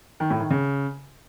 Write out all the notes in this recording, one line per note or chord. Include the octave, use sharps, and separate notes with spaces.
D#3
A2
D#3
C#3